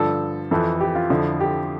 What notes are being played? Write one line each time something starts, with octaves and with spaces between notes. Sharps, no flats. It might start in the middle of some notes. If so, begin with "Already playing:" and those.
Already playing: G2 D3 F3 A4
F2 E3 A4
G4
F4
F2 D3 F3 E4
G4